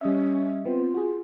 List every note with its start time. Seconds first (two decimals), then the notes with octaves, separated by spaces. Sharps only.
0.01 G3 C#4 D#5 E5
0.65 B3 C4 F4
0.94 F#4 G#4